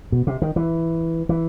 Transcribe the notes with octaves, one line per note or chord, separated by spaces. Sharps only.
B2
C3
D#3
E3
E3